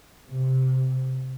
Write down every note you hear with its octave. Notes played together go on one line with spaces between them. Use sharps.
C3